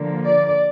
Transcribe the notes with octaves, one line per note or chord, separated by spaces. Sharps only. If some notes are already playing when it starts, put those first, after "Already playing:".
Already playing: D3 F3 A#3
D5